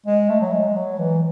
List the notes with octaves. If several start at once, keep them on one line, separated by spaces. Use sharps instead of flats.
G#3
A3
F#3
G#3
F#3
E3